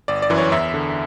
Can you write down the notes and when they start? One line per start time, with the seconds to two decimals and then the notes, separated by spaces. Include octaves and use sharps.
0.08 G1 D5
0.22 D5
0.30 F#2 E3
0.38 C#5
0.52 E2 E5
0.74 D3